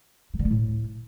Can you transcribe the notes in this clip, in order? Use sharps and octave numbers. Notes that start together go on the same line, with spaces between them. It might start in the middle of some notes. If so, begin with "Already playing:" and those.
D#3
D3
A3
A2